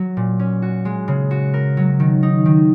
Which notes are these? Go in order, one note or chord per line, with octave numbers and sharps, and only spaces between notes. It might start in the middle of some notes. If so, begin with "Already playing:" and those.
Already playing: F#3
A#2
C#4
F#4
G#3
C#3
F#4
A#4
F#3
D#3
D#4
D#3